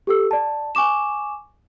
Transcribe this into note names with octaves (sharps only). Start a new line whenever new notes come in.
G4 A4 E6
D5 A5
G#5 C#6 D6 E7